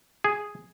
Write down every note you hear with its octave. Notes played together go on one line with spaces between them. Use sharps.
G#4